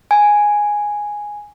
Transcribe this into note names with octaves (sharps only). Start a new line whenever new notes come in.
G#5